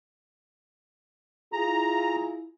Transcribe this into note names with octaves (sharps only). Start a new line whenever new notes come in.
E4 F4 G#4 A#5